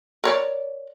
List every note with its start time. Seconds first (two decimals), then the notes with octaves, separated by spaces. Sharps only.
0.24 A#4 C#5 D5